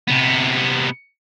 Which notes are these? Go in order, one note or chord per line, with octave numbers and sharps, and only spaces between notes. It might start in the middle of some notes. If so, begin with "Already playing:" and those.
C3 B3